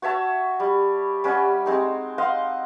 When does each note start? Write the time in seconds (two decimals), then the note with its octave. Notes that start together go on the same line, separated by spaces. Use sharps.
0.02 F#4 C#5 E5 A5
0.60 G3
1.24 G3 C#4 F#5 G#5
1.66 G#3 C4 D#4
2.18 D#5 F5 F#5 C6